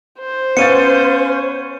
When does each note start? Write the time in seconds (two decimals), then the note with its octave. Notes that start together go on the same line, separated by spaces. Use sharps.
0.19 C5
0.57 B3 C#4 F5 A6 C#7 D#7